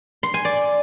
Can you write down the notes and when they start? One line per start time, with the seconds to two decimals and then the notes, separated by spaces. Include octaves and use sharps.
0.23 C6
0.34 G#5
0.45 D5